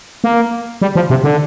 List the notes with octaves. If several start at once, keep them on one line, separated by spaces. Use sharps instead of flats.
A#3
G3
F3
C3
D3